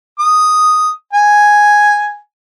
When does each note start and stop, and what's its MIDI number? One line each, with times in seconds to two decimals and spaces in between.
0.19 0.90 87
1.13 2.17 80